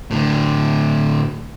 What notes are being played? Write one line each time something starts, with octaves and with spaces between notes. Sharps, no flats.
A2 D3